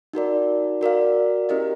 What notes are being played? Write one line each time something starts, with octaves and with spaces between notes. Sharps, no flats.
D#4 F#4 A#4 D5
F#4 A#4 D5 F5
C#4 E4 G4 A#4 D#5